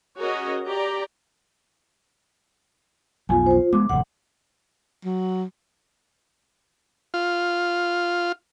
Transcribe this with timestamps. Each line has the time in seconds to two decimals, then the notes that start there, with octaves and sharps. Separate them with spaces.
0.19 C#4 F#4 G#4 A#4 C#5 D#5
0.67 G4 D5 A#5
3.29 B1 F2 F4 G#5
3.46 F4 C5
3.73 G#3 B3 D6
3.89 F1 D#2 A2 F#5
5.05 F#3
7.14 F4